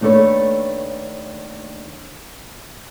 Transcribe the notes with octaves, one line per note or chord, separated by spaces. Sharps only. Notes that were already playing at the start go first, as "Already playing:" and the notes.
D#2 A3 D4 A4 B4 C#5